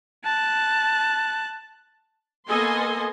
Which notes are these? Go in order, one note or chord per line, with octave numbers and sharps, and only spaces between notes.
A5 F#6
A#3 B3 A4 D#5 G#5 C6